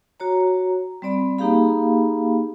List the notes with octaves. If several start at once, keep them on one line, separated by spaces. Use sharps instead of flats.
F#4 C#5 A#5
G3 C4 D5 B5
A#3 D#4 G4 G#4 F5 B5